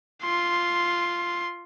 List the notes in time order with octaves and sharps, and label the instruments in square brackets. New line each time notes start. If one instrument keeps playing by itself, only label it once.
[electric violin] F4 C6